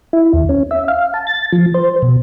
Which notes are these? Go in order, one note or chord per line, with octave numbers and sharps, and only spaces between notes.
E4
D#2
C#4
E5
F5
A5
A6
F3
C5
B2